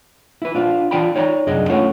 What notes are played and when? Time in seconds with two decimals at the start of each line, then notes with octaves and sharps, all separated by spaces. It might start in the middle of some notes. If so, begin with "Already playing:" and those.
0.42 E4 B4
0.55 D4 F4 C5
0.91 E3 F4 D5 G5 A5 B5
1.15 D#4 C#5 D5 F#5 A#5
1.46 C2 F#2 D4 G#4 D#5
1.70 A3 C#4 F4 A4 C#5 F#5